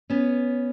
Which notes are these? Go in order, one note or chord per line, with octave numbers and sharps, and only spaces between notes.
B3 C#4